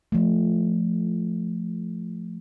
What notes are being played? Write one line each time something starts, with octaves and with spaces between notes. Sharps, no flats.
F3 A3